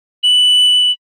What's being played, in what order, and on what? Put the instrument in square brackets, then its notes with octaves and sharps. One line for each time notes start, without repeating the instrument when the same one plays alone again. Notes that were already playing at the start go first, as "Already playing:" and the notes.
[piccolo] F#7